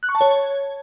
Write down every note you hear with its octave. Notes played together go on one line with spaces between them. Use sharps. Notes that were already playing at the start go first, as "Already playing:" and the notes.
F#6
C#6
A5
C#5